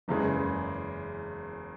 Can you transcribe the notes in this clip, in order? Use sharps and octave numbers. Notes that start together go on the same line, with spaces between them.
F#1 E2 C#3 G#3